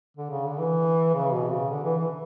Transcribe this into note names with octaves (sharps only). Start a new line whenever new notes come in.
D3
C#3
D3
E3
C#3
B2
C#3
D3
E3
E3